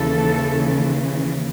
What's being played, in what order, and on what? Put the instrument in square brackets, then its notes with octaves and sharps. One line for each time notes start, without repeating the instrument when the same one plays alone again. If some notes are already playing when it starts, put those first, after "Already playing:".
Already playing: [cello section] D#2 C#3 E3 A4